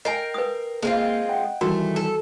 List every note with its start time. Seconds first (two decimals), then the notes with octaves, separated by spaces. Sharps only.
0.05 A#4 D#5 G5 G#5 C7
0.34 B4 D#6
0.83 G#3 A#3 C4 F4
1.29 D#5 F#5 G5
1.61 D#3 E3 G3 A3 F#4 A#4 A#5
1.96 A4